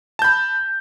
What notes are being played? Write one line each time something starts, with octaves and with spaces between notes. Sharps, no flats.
A5 B5 G6